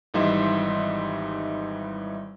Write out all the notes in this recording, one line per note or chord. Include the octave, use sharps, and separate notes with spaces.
G#1 E3 G3 D#4 E5 C6